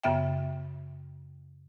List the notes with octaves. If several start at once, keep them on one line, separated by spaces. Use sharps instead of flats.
F#2 C#3 B3 E5 G5